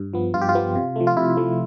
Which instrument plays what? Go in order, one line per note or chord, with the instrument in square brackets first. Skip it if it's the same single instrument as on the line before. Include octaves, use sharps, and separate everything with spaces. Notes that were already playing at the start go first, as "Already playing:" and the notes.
Already playing: [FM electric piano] G2
F3 B3
G2 F4
G4
F4
F3 B3
C3
F3 A3
F4
C3 E4
F3 A3